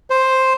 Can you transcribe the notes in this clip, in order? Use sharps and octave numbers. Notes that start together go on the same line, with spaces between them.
C5